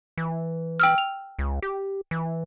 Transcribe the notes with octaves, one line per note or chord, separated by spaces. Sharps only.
E3
G5 E6 F6
F7
C#2
G4
E3